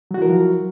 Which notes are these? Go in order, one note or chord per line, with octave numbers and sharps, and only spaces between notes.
F3 F#3 E4 F#4 A#4